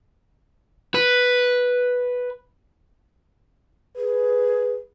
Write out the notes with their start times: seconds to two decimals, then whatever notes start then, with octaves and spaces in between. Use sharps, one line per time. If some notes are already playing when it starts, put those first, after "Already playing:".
0.95 B4
3.97 G#4 B4